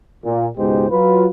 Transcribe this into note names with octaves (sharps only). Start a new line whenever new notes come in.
A#2
C#2 G#2 B2 G#3 G4 C5
F#3 F4 B4